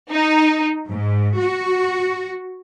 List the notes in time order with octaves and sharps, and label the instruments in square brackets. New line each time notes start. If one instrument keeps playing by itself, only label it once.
[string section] D#4
G#2
F#4